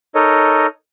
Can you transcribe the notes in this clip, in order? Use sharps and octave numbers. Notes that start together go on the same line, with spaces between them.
D#4 A4 A#4 C#5 D#5